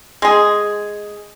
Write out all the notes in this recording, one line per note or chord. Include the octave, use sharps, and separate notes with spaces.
G#3 G#4